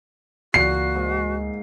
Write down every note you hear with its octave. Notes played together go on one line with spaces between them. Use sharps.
C#2 A#2 E3 F#4 C7
G#2